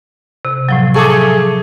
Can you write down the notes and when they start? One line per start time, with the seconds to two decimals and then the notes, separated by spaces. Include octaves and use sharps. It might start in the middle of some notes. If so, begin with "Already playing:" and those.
0.45 C3
0.69 A2 F3 F#3
0.94 A3 G#4 A4 C#6 D6